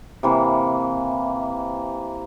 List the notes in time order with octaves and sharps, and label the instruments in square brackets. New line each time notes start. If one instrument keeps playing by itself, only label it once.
[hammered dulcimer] C3 E3 A#3